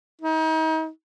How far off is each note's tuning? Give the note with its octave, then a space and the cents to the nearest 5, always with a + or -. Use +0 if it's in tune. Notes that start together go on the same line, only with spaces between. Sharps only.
D#4 +35